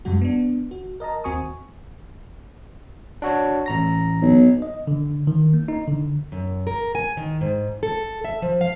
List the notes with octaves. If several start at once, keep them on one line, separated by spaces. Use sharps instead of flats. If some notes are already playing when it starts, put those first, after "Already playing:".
F#2 C3 G3 G#3 F#4
B3 D4
F#4
A#4 D#5 A5 A#5
D#2 C4 F#4 G#5 C#6 D#6
D4 F#4 C#5
A1 A#5 A#6
B1
D#5
D3
D#3
A#3
D#4
D3
F#2
A#4
G#5
D#3
G#2
A4
E5
F3
F5